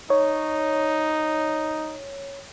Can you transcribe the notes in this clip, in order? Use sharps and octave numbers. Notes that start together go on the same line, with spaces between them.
D#4 C#5